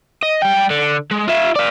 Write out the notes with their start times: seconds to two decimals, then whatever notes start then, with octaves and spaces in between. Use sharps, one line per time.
0.23 D#5
0.42 G3 G5
0.70 D3
1.11 G#3
1.28 F4 E5
1.55 D5 F5